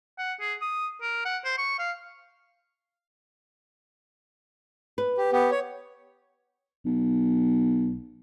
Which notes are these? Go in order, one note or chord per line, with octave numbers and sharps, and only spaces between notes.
F#5
G#4
D#6
A#4
F#5
C5
C#6
F5
B4
G4
B3 G4
C#5
B1